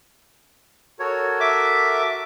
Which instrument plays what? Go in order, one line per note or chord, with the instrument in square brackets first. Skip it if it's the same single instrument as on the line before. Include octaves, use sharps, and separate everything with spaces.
[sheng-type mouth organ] F#4 A4 A#4 [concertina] C#5
[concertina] E5 D6